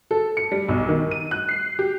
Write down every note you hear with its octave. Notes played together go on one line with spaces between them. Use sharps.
A4
C#7
G3
B1
D#3
D#7
F#6
C7
G4